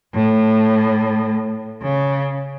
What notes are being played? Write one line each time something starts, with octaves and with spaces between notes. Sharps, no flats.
A2
C#3